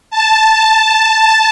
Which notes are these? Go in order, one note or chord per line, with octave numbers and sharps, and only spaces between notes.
A5